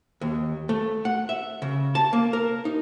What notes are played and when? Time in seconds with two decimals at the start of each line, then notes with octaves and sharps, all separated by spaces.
0.21 D#2
0.69 A3
1.05 F#5
1.29 E5
1.62 C#3
1.95 A5
2.13 A#3
2.33 A#4
2.65 D#4